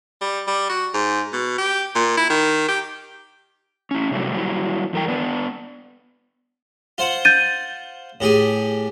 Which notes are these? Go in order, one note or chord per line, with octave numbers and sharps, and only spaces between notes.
G3
G3
F#4
G#2
B2
G4
A#2
E4
D#3
G4
C#4 E4
C3 F#3 G3 A3
F#3 G3 E4
E2 A#4 G5
B3 D4 B4
F4 C5 F#5
G6 A6 D#7
A2 G4 G#4